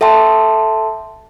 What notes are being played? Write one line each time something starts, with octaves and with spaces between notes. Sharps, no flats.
A4 E5 G5 A5 C6